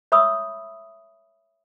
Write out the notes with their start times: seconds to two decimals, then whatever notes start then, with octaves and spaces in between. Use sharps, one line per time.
0.12 C#5 E5 B5 C#6 D#6 E6